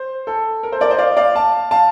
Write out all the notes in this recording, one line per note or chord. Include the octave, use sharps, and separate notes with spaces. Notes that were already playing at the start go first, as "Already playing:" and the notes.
Already playing: C5
A4
A#4
A4 C5
A#4 D5
C5 D#5
D5 F5
D5 F5
F5 A5
F5 A5